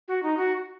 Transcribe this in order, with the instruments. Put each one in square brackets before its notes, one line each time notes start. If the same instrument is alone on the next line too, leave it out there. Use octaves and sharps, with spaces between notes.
[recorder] F#4
D#4
F#4